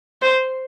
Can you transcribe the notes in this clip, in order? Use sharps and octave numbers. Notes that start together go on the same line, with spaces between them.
C5